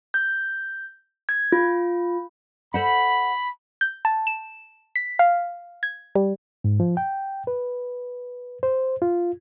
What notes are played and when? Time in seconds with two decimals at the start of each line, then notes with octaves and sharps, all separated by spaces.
0.14 G6
1.29 G#6
1.52 F4
2.74 A4 C5 F#5 B5
3.81 G6
4.05 A5
4.27 E7
4.96 B6
5.19 F5
5.83 G#6
6.15 G3
6.64 G#2
6.80 F3
6.97 G5
7.47 B4
8.63 C5
9.02 F4